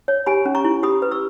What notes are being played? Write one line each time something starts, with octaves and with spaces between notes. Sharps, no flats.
C#5
G4 G#5 B5
C#4
A#5 C#6
E4
G4 B5 D#6
B4
C#6 E6